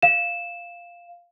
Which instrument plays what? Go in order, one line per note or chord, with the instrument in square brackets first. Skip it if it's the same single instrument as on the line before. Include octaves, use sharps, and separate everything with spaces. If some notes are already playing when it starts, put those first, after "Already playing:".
[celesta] F5 E7